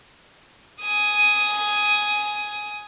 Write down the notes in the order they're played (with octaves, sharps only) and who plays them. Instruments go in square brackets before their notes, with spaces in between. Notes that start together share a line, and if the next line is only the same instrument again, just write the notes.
[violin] G#5 D#6